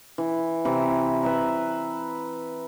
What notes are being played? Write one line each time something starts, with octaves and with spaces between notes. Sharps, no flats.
E3
C3 E3 A#5
B4 E5 A#5